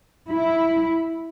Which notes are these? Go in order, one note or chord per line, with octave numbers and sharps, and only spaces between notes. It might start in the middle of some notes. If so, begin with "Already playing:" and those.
E4